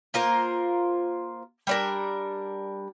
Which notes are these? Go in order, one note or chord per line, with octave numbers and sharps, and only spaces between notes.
A#3 F4 A#4 C5
G3 D4 A#4